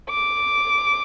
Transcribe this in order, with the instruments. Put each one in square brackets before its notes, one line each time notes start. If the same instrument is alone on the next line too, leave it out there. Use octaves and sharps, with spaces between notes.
[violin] D6